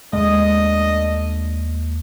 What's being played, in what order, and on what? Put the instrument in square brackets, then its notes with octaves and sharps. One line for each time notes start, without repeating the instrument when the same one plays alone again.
[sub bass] D#2 [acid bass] G#3 [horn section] A3 D4 D#5